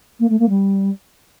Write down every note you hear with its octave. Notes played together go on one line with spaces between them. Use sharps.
A#3
A3
A#3
G3